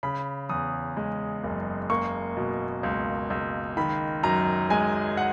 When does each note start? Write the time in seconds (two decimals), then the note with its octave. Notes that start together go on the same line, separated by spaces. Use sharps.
0.03 C#3 B5
0.49 E2 D#6
0.97 G#3
1.44 F#1
1.90 A#3 C#6
2.37 B2
2.83 C#2
3.30 C#2
3.77 D#3 B5
4.23 F#2 A#5
4.70 G#3 G#5
5.17 F#5